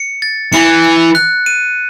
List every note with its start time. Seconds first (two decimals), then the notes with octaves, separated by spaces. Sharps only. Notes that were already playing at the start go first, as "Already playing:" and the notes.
Already playing: C#7
0.22 A6
0.53 E3 C#7
0.84 C#7
1.15 F#6
1.46 D#7